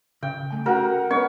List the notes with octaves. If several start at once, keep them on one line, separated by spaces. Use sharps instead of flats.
C#3 G5
C2 A3 G#5
F#4 A4 A#4 F#5 G5 A#5 F#6
B3 C#5 D#5